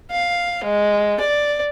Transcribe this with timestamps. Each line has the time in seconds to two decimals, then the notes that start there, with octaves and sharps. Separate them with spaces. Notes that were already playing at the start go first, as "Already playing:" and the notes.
0.11 F5
0.64 G#3
1.20 D5